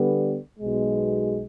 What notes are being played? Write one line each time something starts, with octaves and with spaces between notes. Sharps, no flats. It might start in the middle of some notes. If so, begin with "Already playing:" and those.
Already playing: D3 G3 B3
B1 B2 G#3